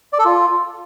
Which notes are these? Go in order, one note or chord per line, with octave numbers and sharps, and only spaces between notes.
D5
A4
F4